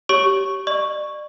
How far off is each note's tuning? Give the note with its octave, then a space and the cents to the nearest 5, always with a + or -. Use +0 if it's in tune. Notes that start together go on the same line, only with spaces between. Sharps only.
G4 -15 C#5 +0 C#6 +0
D5 +30 C#6 +0